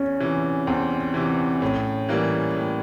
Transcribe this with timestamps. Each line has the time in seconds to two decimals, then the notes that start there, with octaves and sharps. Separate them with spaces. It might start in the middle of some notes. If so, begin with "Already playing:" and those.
Already playing: E2 C#4
0.20 C3 E3
0.67 E2 C4
1.14 C3 E3
1.62 A2 C#4
2.09 E3 G3 A#3
2.56 A2